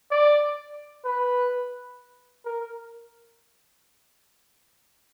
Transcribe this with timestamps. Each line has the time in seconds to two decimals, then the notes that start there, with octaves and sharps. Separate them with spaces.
0.11 D5
1.05 B4
2.45 A#4